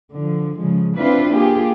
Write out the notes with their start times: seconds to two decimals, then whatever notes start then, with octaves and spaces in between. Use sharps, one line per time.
0.14 D3 F3
0.58 C#3 F3 G#3
0.96 C4 D4 E4 F4 B4
1.34 A#3 F4 G4 G#4